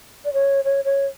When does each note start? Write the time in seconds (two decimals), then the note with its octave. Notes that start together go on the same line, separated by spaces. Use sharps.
0.25 D5
0.33 C#5
0.64 C#5
0.85 C#5